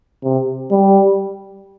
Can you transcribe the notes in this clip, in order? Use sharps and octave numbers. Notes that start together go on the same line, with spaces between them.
C3
G3